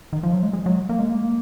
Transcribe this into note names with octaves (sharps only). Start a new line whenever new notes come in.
D#3
F3
F#3
G#3
G#3
F#3
A#3
G#3
A#3